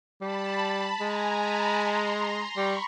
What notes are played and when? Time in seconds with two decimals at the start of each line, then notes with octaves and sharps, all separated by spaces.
0.21 G3 A5 B5
0.99 G#3 G#5 A#5
1.39 A5 B5
1.78 A#5 C6
2.56 G3 B5 C#6